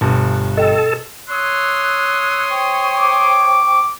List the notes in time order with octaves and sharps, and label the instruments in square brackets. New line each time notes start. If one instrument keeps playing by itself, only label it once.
[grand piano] G1 G2 [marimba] B2
[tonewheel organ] A4 [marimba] D#5 G5
[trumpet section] C#5 C6 D#6 [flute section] E6 F#6
[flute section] C5 G5 C#6
[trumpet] D6